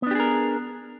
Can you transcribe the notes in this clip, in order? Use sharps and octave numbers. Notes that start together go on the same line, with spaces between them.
B3 D4 G4 G#4 A#4